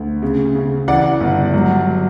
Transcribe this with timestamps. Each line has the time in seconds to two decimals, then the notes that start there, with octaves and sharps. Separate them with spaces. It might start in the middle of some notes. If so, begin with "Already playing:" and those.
Already playing: D2
0.22 C#3
0.55 C#3
0.88 E3 D5 F#5
1.20 G1
1.53 F#3